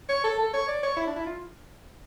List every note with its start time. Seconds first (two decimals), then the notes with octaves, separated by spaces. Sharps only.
0.09 C#5
0.24 A4
0.39 A4
0.54 C#5
0.68 D5
0.83 C#5
0.97 E4
1.07 D4
1.16 E4
1.26 F4